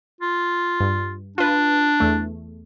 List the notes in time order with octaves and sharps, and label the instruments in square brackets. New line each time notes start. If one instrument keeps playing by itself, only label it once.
[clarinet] F4
[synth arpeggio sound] G2
[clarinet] D4 [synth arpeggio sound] F4 B4
[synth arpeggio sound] E2 A3